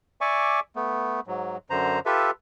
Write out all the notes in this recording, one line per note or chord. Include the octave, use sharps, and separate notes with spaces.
D5 E5 G#5 C#6 D6
A3 B3
G#2 F#3
F#2 D3 C5 A#5
F4 G4 A4 B4 E5